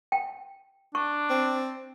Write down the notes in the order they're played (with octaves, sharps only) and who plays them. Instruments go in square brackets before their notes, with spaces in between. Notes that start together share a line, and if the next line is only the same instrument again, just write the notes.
[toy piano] G5
[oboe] D4 [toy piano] C#6
[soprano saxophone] C4